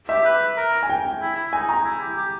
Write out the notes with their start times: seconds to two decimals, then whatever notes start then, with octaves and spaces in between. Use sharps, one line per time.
0.09 G4 E5
0.25 B4
0.57 A#4
0.83 G#5
0.90 G5
1.05 G5
1.21 E4
1.36 E4
1.53 D#4 G#5
1.69 A#5
1.85 E4
2.01 G4
2.17 G4